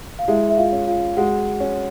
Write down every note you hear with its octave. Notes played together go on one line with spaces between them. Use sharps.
F5
G#3 E4 E5
E5
F4 F5
C#4
F4 F5
G#3 F#4 F#5
C#4